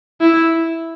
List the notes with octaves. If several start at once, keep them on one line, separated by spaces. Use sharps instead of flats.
E4